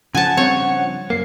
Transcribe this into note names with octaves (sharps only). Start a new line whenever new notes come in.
C#3 F3 F#5 G#5 A5
G2 C4 C#5
F#2 A#3 C7